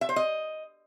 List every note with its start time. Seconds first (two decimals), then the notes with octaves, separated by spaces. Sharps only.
0.01 E5
0.09 C5
0.16 D#5